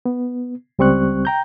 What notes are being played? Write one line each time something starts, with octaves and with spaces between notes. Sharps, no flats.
B3
C#2 G3 C4 C#6 F#6
G5 A#5 G6